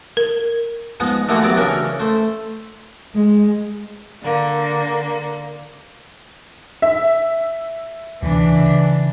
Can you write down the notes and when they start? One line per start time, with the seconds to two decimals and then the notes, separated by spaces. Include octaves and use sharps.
0.17 A#4
1.00 F3 G#3 B3 D#4
1.28 D3 E3 A3 A#3 F#4 G#4
1.42 F#3 B3 E4 G4 D5
1.57 C#3 E3 C#4 D4 A#4 E5
2.00 A3 C5
3.15 G#3
4.22 D3 A#3
6.82 E5
8.22 D2 C3 E3 G3 D4
8.52 C#3